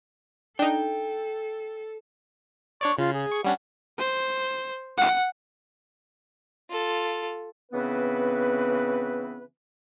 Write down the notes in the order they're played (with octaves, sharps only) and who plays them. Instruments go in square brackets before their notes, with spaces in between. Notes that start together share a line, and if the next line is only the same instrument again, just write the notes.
[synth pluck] D4 D#4 [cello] A4 [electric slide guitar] G5
[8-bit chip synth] D4 C#5 D5 [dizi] C#6
[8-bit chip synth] C#3 [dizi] F4
[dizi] G#4
[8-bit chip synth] C#6
[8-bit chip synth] G3 C#4 D4 [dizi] F#5
[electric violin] C5
F#5
[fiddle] F4 A4
[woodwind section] C#3 E3 B3 C4 B4